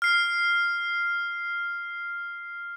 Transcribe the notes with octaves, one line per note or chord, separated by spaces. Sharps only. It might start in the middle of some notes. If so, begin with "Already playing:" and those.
F6 C7